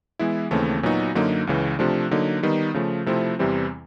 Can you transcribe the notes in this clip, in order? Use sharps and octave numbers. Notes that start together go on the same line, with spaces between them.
E3 G#3 B3 E4
D#2 C#3 E3 A3 C4
A#2 F#3 B3 D#4 F#4
F#2 D3 F#3 A#3 D#4
C#2 C#3 E3
C3 F3 A3 D4
D3 F#3 A#3 D#4
D#3 G3 B3 D#4
C#3 F3 A3
C3 F3 A3 C4 E4
E2 C3 E3 G3 C4